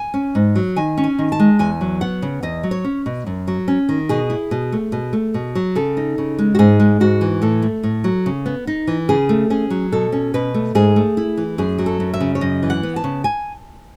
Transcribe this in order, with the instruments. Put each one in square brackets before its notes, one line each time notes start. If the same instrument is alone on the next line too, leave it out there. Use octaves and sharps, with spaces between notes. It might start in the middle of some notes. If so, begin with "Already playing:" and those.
Already playing: [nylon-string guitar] G#5
C#4
G#2
F#3
D#3 G#5
C#4
G#5
D#3
A5
G#3
E2 G#5
F#3
B3 F#5
C#3
E2 D#5
F#3
C#5
C#4
B2
F#2
F#3
C#4
D#3
B2 G#4
E4
B2
A3
B2
A3
B2
F#3
C#3 A4
D#4
C#3
G#3
F#4
G#2 G#4
G#3
G#2 F#4
E3
A2 A4
A3
A2
F#3
C#3
B3
D#4
E3
C#3 G#4
A3
C#4 G#4
F#3
B2 A4
C#4
B2 B4
A3
G#2 G#4
A3
E4
E3
F#2 G#4
F#3
A4
F#2
E5
C#3
C#5
F#2 D#5
E3
F#5
B3
A5
C#3
G#5